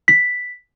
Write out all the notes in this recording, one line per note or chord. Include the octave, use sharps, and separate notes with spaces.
B6